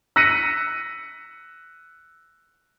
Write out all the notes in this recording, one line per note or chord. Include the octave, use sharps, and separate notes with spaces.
E6 F#6 A#6 B6 C#7 D#7